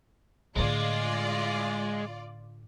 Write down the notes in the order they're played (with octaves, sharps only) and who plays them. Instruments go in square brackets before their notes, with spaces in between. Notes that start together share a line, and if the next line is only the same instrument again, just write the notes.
[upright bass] A2 D3 [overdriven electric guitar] G#3 [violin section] F4 D5